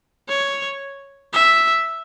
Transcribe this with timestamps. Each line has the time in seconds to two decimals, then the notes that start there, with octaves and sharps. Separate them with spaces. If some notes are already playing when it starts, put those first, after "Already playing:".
0.28 C#5
1.33 E5